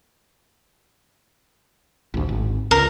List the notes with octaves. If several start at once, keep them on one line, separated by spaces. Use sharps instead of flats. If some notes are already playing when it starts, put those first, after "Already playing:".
A1 D2
G#1
C#2 A#4